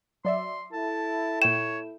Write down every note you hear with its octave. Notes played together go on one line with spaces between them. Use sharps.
F#3 D5 E5 C6
E4 A4 A5
A#2 C#5 G5 E7